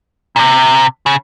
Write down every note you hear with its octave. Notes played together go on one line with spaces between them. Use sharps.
A#2
C3
C#3